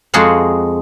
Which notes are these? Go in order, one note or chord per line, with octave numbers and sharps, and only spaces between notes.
F2 G#3 F#4 G#4 F5 F#5